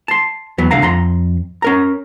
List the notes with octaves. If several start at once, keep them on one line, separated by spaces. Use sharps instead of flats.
A5 C6
E2 F#3 B3
C2 D3 F5 F#5 A#5
F2 A#5 C6
C#4 A#4 A#5